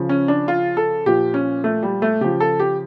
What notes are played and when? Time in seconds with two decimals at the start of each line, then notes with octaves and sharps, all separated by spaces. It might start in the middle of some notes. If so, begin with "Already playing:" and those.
Already playing: C#3 F3
0.09 C#4
0.28 D4
0.48 F4
0.77 A4
1.06 A#2 F3 G4
1.34 C#4
1.64 A3
1.83 G3
2.02 A3
2.21 C#3 F3 G4
2.40 A4
2.60 G4